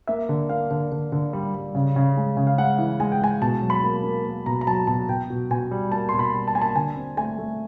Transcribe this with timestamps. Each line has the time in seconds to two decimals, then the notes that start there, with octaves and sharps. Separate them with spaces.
0.07 A#3 E5
0.29 D3
0.49 A#3 F5
0.71 D3
0.92 D3
1.12 D3
1.33 G3
1.54 G3
1.75 C#3
1.96 C#3
2.17 G#3
2.37 C#3
2.47 F5
2.58 G#3 F#5
2.79 E3
3.00 G#3 G#5
3.12 G5
3.21 G#3 G#5
3.42 B2 A5
3.62 F#3
3.70 B5
3.83 A#3
4.04 A#3
4.25 A#3
4.46 B2 A#5
4.61 A#5
4.66 F#3 A5
4.87 B2 A5
5.09 B2 G5
5.30 B2
5.50 B2 G#5
5.71 G3
5.92 A#3 A5
6.09 B2 C6
6.19 B5
6.34 G3
6.48 A5
6.55 A#3 G#5
6.61 A5
6.75 D3 G#5
6.96 C4
7.17 A3 G#5
7.39 A3